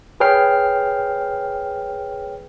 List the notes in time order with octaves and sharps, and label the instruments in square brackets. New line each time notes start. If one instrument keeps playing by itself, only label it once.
[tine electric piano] G#4 B4 C#5 G5 F6 C7